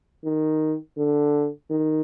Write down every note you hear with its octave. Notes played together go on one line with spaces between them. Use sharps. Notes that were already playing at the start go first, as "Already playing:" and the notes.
D#3
D3
D#3